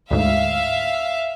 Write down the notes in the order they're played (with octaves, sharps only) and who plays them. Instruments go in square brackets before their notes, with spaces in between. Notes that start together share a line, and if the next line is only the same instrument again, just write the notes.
[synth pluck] D2 G#2 [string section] E5 F5